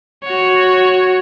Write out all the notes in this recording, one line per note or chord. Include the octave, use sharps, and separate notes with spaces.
F#4 C#5